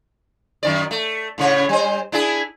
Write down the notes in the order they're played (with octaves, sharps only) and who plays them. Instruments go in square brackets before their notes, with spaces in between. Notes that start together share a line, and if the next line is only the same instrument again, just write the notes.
[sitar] F#2 D#3 D5
A3
A2 C#3 C#5
G3 C5
D4 E4 G#4